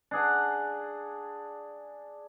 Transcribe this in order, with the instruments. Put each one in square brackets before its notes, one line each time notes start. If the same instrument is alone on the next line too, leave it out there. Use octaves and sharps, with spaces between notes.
[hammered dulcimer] D4 G#4 F#5